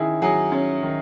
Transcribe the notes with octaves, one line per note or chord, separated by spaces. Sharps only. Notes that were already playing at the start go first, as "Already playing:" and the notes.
Already playing: D#3 C#4 E4 G#4
F#3 G#4
C#4
D#3